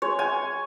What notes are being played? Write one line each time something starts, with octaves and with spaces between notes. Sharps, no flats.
G#3 C#5
G#5